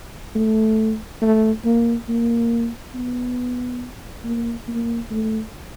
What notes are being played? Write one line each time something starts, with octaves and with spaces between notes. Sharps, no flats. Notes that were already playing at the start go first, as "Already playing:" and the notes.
A3
A3
A#3
A#3
B3
A#3
A#3
A3